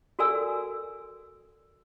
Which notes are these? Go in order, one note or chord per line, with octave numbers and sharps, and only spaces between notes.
F#4 A4 A#4 D5 G#5 E6